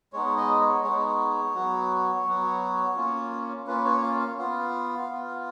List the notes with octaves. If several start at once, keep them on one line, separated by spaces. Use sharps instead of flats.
G#3 B3 D#4 C#5
D#5
C#5
G#3 B3 D#4 C#5
F#3 B3 F#4
F#3 B3 F#4
A#3 C#4 F4
A#3 C#4 F4 B4
C#5
F5
F5
B3 F4 F5
B3 F4